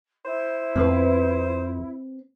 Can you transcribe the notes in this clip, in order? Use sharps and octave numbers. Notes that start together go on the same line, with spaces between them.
E4 C5
F2 C4 B4